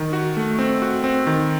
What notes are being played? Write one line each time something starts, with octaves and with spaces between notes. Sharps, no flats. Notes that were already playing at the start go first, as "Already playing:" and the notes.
Already playing: D#3
F#4
A3
C4
F#4
C4
D#3